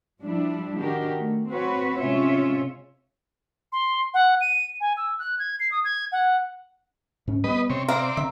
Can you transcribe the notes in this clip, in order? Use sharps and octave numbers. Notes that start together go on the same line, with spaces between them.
F3 G3 D4 E4
D#3 D4 F#4 G4 A#4
A3
C4 F#4 B4 C#5
C3 G#3 C#4 F4 C#5 E5
C6
F#5
D#7
G#5
E6
F#6
G#6
C7
D#6
G#6
F#5
G#2 C#4
G3 B3 B4 D#5
C3 C4 C#5
C4 C5 D5 E5 F5 A#5
D3 E5